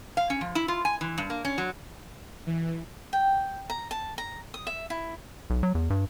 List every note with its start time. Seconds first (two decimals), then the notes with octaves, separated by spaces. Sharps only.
0.17 F5
0.30 C#4
0.41 F3
0.55 E4
0.68 F4
0.85 G#5
1.01 E3
1.18 G2
1.30 A#3
1.45 C#4
1.58 F#3
2.47 E3
3.13 G5
3.70 A#5
3.91 A5
4.18 A#5
4.54 D#6
4.67 E5
4.90 E4
5.50 B1
5.63 F#3
5.75 E2
5.90 G2